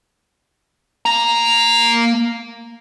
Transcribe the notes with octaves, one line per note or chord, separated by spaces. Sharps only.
A#3 A#5